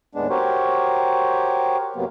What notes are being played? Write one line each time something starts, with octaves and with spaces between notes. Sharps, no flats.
D#2 A2 G#3 B3 D4
F#4 G4 A#4 C5 C#5
F#2 C3 F#3 A#3 B3